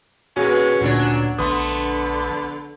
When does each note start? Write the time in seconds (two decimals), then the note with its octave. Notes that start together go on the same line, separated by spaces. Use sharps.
0.37 A#2 C#4 F#4 G#4
0.81 D2 A#2 F#3 D4
1.38 A#1 D3 A3 B3 C6 D#6